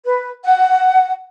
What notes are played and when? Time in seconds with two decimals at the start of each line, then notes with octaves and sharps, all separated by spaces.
0.05 B4
0.44 F#5